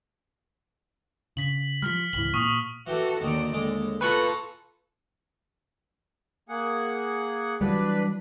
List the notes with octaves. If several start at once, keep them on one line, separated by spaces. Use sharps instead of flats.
C#3 B6 F#7
F3 G3 F6 B6 F#7
G#1 C#2 E3 F#7
A#2 C#6 D#6
E3 F#4 G4 A4
D#2 D3 D#3 F#4 D5
D#2 D3 G#3
F4 A4 B4 G#5 A#5 C#6 F#6
A#3 G#4 F#5
E3 F#3 G3 D4 B4